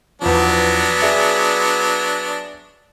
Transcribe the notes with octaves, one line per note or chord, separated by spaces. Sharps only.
E2 F3 F#3 B3 D4
G#4 D5 E5